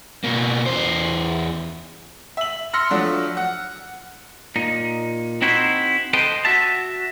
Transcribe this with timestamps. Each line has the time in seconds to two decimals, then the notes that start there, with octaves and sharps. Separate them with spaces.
0.24 B2 A#3
0.66 E2 C5
2.37 E5 F#7
2.73 C6 E6 F6 A#6 C#7
2.90 F3 F#3 A3 D4
3.37 F#5
4.56 A#2 D#4
5.42 C4 D#4 E4 F#4 C5
6.13 A4 B4 C5 D#5 G5
6.45 F#4 E5 A5